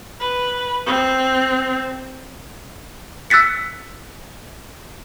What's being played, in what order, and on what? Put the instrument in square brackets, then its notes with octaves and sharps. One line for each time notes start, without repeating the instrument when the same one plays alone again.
[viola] B4
C4
[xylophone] E6 F#6 A6 B6 C#7